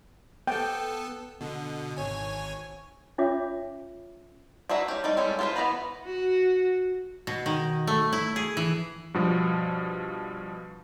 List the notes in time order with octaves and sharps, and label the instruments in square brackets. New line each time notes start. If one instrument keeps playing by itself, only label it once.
[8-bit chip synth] B3 A4 [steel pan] G5
[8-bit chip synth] B2 D3
G#1 C#5 G#5
[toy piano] C#4 F4 C#5 E5 F5 D6
[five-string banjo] D4 F#4 B4 E5 A#5
C#4 G4
G3 A3 D#4 D5
G3 G#3 C#4 E4 A4
F4 G#4 A4 B4 C5
E3 B3 B4 A#5 B5
[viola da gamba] F#4
[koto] B2
D#3
A3
E4
G#4
E3
[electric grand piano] G2 B2 F3